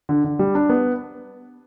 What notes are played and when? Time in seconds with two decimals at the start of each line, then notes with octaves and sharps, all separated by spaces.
0.09 D3
0.24 D3
0.39 G3
0.55 D4
0.70 B3